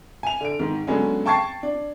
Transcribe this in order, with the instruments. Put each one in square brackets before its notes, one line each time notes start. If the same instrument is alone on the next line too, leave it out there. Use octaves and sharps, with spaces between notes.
[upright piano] G#5 F7
D3 D7
G#2 D#3
D3 F#3 G#3 B3 C#4
G5 A5 C#6 G#6 A6 C7
D4